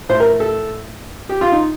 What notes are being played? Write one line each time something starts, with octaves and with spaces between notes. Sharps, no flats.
A2 C5
A#4
A4
G4
F4
D#4